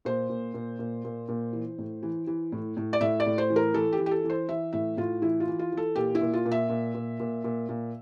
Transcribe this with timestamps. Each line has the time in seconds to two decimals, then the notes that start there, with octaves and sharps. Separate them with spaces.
0.05 A#2 C5
0.29 A#2
0.54 A#2
0.79 A#2
1.04 A#2
1.28 A#2
1.53 E3
1.78 A2
2.03 E3
2.27 E3
2.52 A2
2.77 A2
2.93 D5
3.00 A2 E5
3.20 D5
3.26 A2
3.38 C5
3.50 E3
3.56 A#4
3.74 E3 A4
3.92 G4
3.99 E3
4.06 G4
4.11 A4
4.24 E3
4.30 C5
4.49 E3 E5
4.73 A2 E5
4.97 A2 F4
5.22 E3 E4
5.40 F4
5.48 E3
5.59 F4
5.72 E3
5.77 A4
5.96 A#2 G4
6.15 E4
6.21 A#2
6.34 F4
6.45 A#2
6.52 E5
6.69 A#2
6.94 A#2
7.20 A#2
7.44 A#2
7.69 A#2